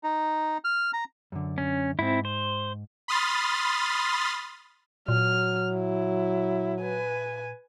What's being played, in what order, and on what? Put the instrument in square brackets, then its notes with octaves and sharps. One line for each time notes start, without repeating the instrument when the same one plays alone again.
[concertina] D#4
F6
A#5
[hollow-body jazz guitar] F#2 D3
[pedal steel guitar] C#4
[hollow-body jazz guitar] G#2 [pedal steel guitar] C4 E4
[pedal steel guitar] C5
[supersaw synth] B5 C6 D#6 F6 A6
[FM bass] A#2 [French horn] F#3 [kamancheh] F6
[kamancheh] E4
B4 G#5